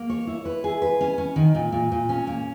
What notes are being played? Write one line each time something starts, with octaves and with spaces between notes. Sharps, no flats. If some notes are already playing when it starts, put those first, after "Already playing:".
Already playing: A#3
C#5
E4
B4
G#4
B4
C#4
C#4
D#3
A#2
A#2
A#2
C#4
A#3